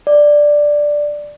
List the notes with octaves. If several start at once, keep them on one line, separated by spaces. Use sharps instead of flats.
D5